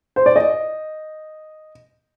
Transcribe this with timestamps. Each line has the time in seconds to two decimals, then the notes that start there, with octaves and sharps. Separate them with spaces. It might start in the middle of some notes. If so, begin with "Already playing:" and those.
0.16 C5
0.26 D5
0.36 D#5